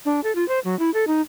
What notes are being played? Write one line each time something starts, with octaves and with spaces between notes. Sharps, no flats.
D4
A4
F4
C5
F#3
E4
A4
D#4